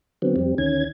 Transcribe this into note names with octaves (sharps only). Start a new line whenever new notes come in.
D3 F#3 B3 C4
F2 G3 C4
D2 D#3 C#4 G#6